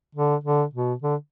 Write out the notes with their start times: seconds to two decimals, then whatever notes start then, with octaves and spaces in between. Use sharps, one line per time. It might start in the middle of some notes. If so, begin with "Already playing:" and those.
0.15 D3
0.44 D3
0.74 B2
1.02 D3